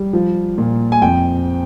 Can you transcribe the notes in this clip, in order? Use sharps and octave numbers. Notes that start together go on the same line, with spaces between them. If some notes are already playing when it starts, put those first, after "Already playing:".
Already playing: G3
F3
A#2
G#5
F2 G5